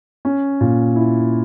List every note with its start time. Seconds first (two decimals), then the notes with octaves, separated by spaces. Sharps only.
0.25 C#4
0.61 A#2
0.96 E4